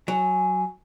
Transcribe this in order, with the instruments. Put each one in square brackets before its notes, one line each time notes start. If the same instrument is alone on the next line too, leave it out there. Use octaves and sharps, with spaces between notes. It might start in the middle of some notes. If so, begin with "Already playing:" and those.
[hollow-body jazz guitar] F#3 [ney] G#5